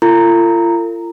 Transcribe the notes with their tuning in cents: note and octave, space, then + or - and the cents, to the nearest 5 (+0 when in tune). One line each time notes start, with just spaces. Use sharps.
F4 -35 A4 +40 A#5 -10